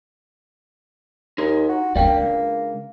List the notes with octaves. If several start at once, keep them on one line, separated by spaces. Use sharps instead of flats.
D#2 D#4 C6
F#4
A#3 C#4 D4 D5 G5
C#2